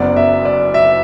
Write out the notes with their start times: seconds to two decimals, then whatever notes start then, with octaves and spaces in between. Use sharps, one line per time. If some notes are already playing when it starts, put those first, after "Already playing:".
Already playing: F#1 F#2 F#3 B3 D5 F#5
0.17 E5
0.45 D5
0.74 E5